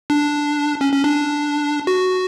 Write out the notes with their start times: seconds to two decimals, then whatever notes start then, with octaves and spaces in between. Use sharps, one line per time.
0.10 D4
0.81 C#4
0.92 C#4
1.04 D4
1.87 F#4